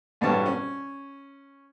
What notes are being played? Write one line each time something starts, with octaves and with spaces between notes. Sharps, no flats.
A1 G2 B2 B3 C#5 A5
C#4